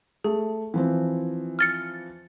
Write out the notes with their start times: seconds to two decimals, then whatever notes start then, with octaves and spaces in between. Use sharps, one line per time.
0.24 A3 G#4
0.74 E3 F3 C4
1.59 F6 A6 C#7